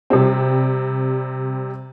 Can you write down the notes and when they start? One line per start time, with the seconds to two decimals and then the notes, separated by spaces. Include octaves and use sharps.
0.10 C3 G3 C4